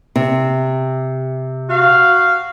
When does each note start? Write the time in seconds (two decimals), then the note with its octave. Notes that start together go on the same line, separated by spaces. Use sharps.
0.16 C3
1.70 F#4 F5